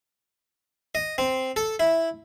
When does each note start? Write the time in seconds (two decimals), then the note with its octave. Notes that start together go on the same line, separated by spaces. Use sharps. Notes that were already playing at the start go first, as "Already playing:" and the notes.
0.95 D#5
1.18 C4
1.56 A4
1.80 E4